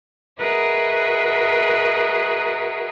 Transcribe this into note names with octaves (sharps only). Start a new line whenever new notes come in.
F#4 G#4 A#4 B4 D#5 E5